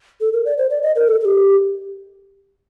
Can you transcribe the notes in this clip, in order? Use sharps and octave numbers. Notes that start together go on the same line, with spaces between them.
A4
A#4
D5
C5
D5
D#5
A#4
A4
A4
G4